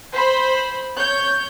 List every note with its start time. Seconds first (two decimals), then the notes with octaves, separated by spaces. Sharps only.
0.13 C5 B5
0.97 C#5 G6